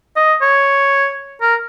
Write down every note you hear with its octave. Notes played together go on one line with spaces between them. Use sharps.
D#5
C#5
A#4